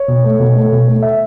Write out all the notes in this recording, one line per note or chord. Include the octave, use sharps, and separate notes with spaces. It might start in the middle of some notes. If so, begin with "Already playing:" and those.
Already playing: C#5
B2
A3
B2
A3
B2
A3
E5